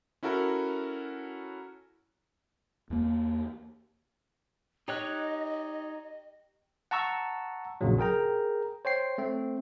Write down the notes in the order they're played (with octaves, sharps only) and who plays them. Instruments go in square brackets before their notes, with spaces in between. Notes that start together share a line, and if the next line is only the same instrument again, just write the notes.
[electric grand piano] C#4 E4 F#4 A4 A#4
[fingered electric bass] E2 A#3
[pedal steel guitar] D#4 C#5 F#6 [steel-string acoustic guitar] G4 [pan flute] D#5
[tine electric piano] F#5 A5 A#5 C#6 E6
A#1 F#2 A#2 C#3 F#3
G#4 A#4 G5 A#5
C5 C#5 G5 C7
A3 C4